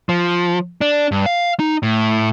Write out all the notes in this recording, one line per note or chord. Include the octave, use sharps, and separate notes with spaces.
F3
D4
G2
F5
D#4
A2